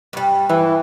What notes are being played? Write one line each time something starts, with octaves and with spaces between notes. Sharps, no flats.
G2 G3
G2 E3